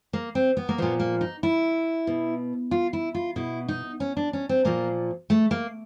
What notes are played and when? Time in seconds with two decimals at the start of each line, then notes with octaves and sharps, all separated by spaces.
0.13 A#3
0.35 C4
0.57 B3
0.69 A#3
0.78 A#2 F3 B3
1.00 A#3
1.21 D#4
1.43 E4
2.07 B2
2.71 F4
2.93 E4
3.15 F4
3.36 B2 E4
3.68 D#4
4.00 C#4
4.17 D4
4.33 C#4
4.49 C4
4.65 A#2 F3 A#3
5.30 A3
5.51 A#3